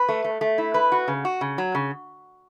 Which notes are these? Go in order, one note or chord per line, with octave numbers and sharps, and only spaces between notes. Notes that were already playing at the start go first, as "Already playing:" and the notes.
Already playing: B4
A3
A3
A3
E4
B4
F#4
C#3
F#4
C#3
F#3
C#3